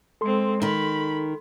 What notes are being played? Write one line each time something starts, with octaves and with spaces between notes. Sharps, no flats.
G#3 C4 A4 C6
D#3 D#4 B5